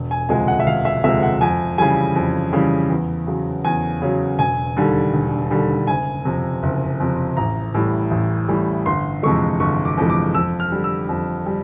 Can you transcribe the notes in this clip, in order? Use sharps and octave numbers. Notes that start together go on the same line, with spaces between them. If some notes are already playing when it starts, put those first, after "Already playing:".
Already playing: E1
G#5
D2 C3 F3 G#3 G#5
F#5
E5
E1 F5
E5
D2 C3 F3 G#3 E5
F#5
F2 G#5
C#3 E3 G3 G#5
F2
C#3 E3 G3
E2
C#3 F#3
E2 G#5
C#3 F#3
E1 G#5
D#2 D3 G3
E1
D#2 D3 G3
F#1 G#5
F2 C3
F#1
F2 C3
A1 A#5
A2 E3 G3
A1
A2 E3 G3
G1 C6
F2 C3 E3 G#3 C#6
G1 C#6
D6
F2 C3 E3 G#3
D6
F2 E6
F6
D3 G3
E6
F2
G3